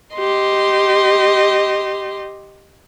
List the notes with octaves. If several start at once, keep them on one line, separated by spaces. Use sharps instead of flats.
G4 D#5 C6